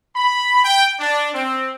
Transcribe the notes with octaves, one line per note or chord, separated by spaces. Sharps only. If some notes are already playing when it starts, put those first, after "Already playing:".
B5
G5
D4
C4